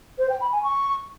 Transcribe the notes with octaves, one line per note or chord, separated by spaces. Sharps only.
C5
G5
B5
G#5
C#6